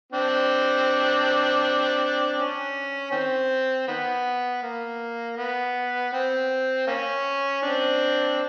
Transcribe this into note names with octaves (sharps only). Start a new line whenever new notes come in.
C4 D4
C#4
D#3 C4
D#3 B3
A#3
B3
C4
A#3 C#4
C4 D4